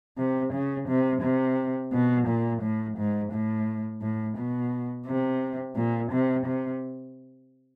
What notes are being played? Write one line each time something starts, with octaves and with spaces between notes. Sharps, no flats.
C3
C#3
C3
C3
B2
A#2
A2
G#2
A2
A2
B2
C3
A#2
C3
C3